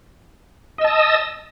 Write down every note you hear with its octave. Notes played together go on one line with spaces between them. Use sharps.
D#5 A5 D#6 E6